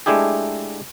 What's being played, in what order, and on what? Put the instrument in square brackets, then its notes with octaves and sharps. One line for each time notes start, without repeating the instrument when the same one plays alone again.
[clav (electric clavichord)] G#3 A3 D4 E4 G4 G#4